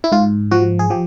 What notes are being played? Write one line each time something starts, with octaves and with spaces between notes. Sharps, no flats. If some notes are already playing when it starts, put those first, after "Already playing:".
E4
G#2 F4
F3 F#4
G#4
F3 G4